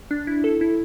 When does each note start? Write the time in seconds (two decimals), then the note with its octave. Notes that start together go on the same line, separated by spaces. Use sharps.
0.11 D4
0.27 E4
0.44 A4
0.61 E4